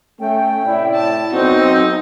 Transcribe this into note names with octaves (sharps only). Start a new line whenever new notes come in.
A3 C#4 G5
A2 C3 E4 D5
A5
B1 C4 D#4 F#4